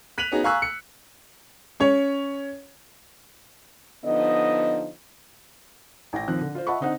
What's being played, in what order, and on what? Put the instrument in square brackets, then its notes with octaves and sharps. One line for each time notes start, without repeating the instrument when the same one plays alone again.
[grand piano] F#6 B6 D#7 F7 F#7
B3 C#4 D#4 F#4 G#4
F5 G#5 A#5 C#6 E6 F#6
C#7
[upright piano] C#4 C#5
[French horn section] D3 F3 B3 D#4 D#5
[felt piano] A1 G5 A#6
D#2 F3 C4 F#6
D3
F4 C5
D#5 E5 F#5 A5 B5 C#6
D3 C4 D#4 C5 F#5